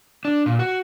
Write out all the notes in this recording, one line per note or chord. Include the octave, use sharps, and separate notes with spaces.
D4
A#2
F#4